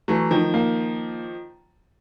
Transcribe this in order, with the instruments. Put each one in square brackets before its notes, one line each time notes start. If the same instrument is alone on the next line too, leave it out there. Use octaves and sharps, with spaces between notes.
[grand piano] E3 F#3 [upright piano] A3
[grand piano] D#3 F3
[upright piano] A#3